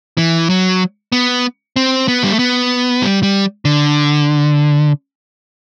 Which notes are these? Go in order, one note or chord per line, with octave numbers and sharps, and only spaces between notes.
E3
F#3
B3
C4
B3
G3
A3
B3
G3
G3
D3